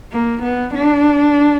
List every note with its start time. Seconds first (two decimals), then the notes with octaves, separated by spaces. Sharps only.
0.12 A#3
0.43 B3
0.74 D4